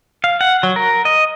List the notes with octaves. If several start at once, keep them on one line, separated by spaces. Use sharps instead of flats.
F5
F#5
F#3
A#4
D#5